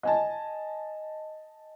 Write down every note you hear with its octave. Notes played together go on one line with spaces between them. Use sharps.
D#5 G#5 A5